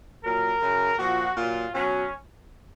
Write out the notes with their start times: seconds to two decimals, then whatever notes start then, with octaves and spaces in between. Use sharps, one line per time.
0.24 A#2 F#3 A#4
0.61 F#2 C#3 F#3
0.99 A#2 F3 F#4
1.36 A#2 F#3 F4
1.73 B2 F#3 C#4